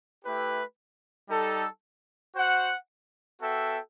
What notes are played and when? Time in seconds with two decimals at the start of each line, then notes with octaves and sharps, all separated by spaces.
0.25 A3 E4 G4 B4
1.29 G3 D#4 A4
2.36 F#4 C5 F#5
3.42 B3 F#4 A4 E5 G5